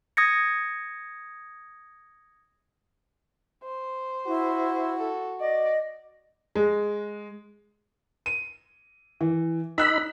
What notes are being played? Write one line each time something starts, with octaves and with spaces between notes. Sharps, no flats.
D#6 G#6 A#6 C#7
C5
E4 F#4
A4
D5 D#5
G#3
D#7
E3
D#4 B5 E6 F#6